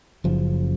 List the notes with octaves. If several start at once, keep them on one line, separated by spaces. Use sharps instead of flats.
F#1 F#2 C#3 F3